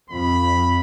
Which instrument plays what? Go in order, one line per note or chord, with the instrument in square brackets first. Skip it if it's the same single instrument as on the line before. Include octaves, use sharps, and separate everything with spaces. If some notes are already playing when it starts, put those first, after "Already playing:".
[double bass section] F2 [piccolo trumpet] B5